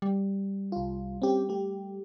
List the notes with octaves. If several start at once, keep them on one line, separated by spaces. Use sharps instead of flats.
G3
C2 F4
C4 C#4 G4
A3 G4